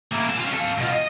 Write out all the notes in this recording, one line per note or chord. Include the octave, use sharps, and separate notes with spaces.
A#3 E4
A#2 A5
C#4 F4
A4 F5
B2 F4
D#5